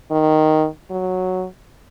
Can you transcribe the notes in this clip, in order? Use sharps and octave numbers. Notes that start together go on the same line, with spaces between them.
D#3
F#3